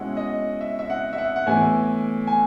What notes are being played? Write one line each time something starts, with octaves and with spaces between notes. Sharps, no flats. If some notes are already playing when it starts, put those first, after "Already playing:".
Already playing: B2 G#3 C#4 E4 F#5
D#5
E5
E5
F#5
E5
F#5
F#5
A2 E3 B3 E4 G#5
G#5